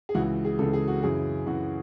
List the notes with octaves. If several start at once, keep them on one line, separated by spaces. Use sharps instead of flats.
G#4
C#2 C#3 E3 F#4
G#4
C#2 C#3 E3 A4
G#4
F#4
F#2 C#3 E3 G#4
F#2 C#3 E3 F#4